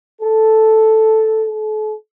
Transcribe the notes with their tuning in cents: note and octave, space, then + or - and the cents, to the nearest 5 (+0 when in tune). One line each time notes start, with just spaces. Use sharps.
A4 +0
A4 -40